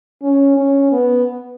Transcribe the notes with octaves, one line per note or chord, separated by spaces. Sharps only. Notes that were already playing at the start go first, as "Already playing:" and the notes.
C#4
C#4
B3